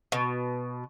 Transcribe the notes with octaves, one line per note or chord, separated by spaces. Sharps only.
B2